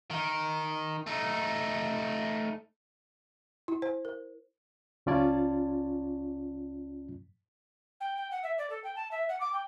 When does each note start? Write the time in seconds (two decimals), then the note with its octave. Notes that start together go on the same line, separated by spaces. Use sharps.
0.10 D#3
1.07 A3 D#4
3.68 E4
3.82 C5
4.05 A#4
5.06 C#2 C#4 F4 D5 A5 G#6
8.00 G5
8.17 G5
8.31 F#5
8.43 E5
8.58 D5
8.70 A4
8.84 G5
8.96 A5
9.11 E5
9.29 F#5
9.40 D6
9.53 G5